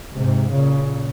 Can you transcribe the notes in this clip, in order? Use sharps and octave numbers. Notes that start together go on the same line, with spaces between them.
G#2 C3
A#2 C#3